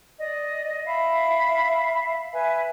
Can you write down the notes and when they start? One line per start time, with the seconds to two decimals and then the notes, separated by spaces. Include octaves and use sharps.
0.19 D5 D#5
0.85 E5 F5 B5
2.32 B4 E5 G#5